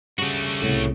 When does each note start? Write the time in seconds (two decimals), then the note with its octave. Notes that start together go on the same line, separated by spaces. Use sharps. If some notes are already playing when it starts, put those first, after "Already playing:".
0.18 G2 C#3 A3 F#4
0.62 C2 A2